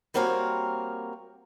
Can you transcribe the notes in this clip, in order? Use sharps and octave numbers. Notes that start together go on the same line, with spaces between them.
G3 A#3 C4 F#4 A#4 C#5